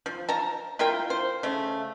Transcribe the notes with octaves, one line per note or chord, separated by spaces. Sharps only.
F3
A5 A#5
E4 F4 A#4 G5
C5
C#3 A3